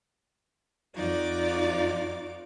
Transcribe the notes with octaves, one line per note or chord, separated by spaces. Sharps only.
F2 D#4 F4 F#4 D5 D6